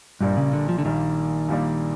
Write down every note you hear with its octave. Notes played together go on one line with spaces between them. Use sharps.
A#1 G2 A#2 G3 A#3 D4
C#3
D3
F3
D3
A#1 A#2 D#3 G3 A#3 D4
A#1 A#2 G3 A#3 D4